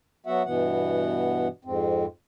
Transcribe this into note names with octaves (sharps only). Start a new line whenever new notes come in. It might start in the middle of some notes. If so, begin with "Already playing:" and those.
F#3 B3 F#4 E5 F#5
G2 B2 E3 B3 F#5
F2 G#2 C4